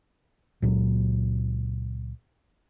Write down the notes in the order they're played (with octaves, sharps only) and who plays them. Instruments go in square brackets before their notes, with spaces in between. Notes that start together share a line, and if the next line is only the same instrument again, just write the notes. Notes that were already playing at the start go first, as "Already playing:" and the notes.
[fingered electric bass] C#2 A#2 F#3